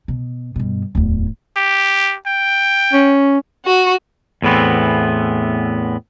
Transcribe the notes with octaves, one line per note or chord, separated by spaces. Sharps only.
B2
G2 B2
D1 E2
G4
G5
C#4
F#4
E2 A2 E3 B3 C4